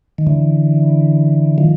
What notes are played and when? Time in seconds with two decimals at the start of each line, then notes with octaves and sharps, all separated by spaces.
0.18 D#3
0.27 D3 E3
1.58 D#3 F3